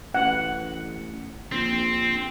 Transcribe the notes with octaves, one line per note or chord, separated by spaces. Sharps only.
A1 F#5
A#1 C4